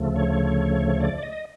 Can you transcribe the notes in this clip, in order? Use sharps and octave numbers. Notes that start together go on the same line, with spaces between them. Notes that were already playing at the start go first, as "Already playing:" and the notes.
Already playing: D2 C#3 F3 A3
C#5
D5
D#5